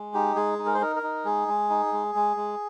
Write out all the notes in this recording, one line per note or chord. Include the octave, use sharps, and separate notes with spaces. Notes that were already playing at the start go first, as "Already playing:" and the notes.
Already playing: G#3
D#4 G4
G#3 G#4
D#4
A#4
C5
D#4 A#4
A#4
D#4
G#3 G#4
G#3
D#4
G#3
G#3
G#3